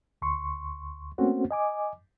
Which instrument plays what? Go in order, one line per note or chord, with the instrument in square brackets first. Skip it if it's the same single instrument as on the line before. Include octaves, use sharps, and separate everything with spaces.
[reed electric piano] D2 C6 C#6
A3 A#3 C4 C#4 F#4 C5
D#5 G#5 D6